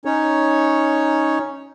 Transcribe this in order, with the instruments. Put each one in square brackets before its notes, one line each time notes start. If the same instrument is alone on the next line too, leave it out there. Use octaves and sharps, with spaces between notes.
[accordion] C#4 D#4 C#5